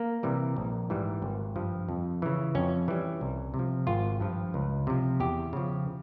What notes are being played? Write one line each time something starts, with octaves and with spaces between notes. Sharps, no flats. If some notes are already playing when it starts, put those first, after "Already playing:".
Already playing: A#3
C3 E3 G3
A#1
G#2 E3 G3
G#1
G2 F3
F2
C#3 E3
F2 C#4
E3 G3
C2
C3
F3
G#1 F4
G2 F3
C#2
C3 F3
E2 G4
C#3 F3